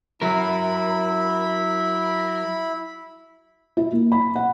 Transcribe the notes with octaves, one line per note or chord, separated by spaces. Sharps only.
F#3 E4 A#4 B5
E4
A#3
B5
F#5